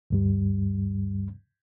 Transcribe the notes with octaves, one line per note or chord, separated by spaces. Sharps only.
D2 G2 G3